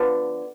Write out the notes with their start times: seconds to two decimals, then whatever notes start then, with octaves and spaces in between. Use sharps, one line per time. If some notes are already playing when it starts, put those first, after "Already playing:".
Already playing: D3 F3 B3